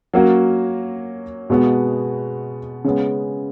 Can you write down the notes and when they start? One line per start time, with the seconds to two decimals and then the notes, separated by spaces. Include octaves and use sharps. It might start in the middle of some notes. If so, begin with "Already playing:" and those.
0.14 F#3 A#3 C#4 F#4
1.50 B2 G#3 B3 F#4
2.84 C#3 G#3 B3